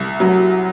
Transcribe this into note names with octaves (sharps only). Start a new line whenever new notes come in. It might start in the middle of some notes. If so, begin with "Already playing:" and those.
Already playing: C2
F#3